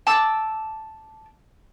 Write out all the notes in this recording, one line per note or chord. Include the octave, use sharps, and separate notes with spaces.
A5 D6 E6